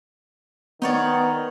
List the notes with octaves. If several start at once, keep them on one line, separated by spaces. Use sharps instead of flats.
D#3 B3 D#4 C#5 D5 F#5